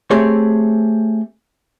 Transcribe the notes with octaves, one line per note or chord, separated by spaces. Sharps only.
A3 C4 G4 G#4 C#5